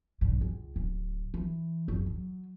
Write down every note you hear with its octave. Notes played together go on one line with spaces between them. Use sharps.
B1 G2
C#2
D1
E3
F#1
F#3